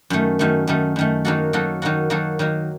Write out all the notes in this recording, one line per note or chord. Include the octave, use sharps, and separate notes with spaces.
F#2 D#3 A3
F#2 D#3 A3
F#2 D#3 A3
F#2 D#3 A3
D#3 F#3 A#3 F#4 A4
D#3 F#3 A#3 F#4 A4
D#3 F#3 A#3 F#4 A4
D#3 F#3 A#3 F#4 A4
D#3 F#3 A#3